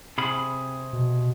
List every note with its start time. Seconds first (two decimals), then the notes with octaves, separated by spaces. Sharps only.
0.18 C3 G#4 B5
0.93 B2